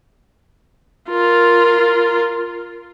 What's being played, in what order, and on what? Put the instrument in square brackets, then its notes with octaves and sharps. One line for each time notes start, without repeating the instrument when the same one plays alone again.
[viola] F4 A#4